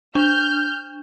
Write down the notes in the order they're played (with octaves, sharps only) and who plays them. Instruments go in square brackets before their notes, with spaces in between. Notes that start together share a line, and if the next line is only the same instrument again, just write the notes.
[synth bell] D4 [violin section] F6 G6